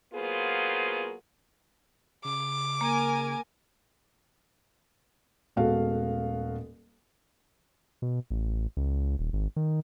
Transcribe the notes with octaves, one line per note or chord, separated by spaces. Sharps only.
F#3 A#3 B3 F4 G#4 C5
C#3 D6
A#3 A#4 G#5
D#1 G#3 B3 F#4 A4 F5
B2
A1
C#2
D#1
G#1
D#3